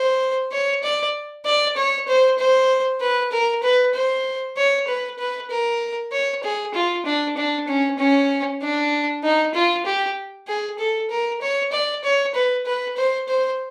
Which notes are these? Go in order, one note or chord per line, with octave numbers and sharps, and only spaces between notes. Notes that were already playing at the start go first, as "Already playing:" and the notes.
Already playing: C5
C#5
D5
D5
C#5
C5
C5
B4
A#4
B4
C5
C#5
B4
B4
A#4
C#5
G#4
F4
D4
D4
C#4
C#4
D4
D#4
F4
G4
G#4
A4
A#4
C#5
D5
C#5
B4
B4
C5
C5